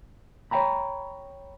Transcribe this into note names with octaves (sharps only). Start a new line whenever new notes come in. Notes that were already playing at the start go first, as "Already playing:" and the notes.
C#5 F5 G5 A#5 B5